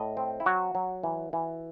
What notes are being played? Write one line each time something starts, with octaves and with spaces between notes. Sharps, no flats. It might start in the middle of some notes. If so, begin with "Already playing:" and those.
Already playing: A2 D#5
C4
E4
F#3 F#4
F#3
E3
E3